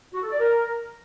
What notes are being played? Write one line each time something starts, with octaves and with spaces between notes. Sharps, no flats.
F#4
A4
D5
A#4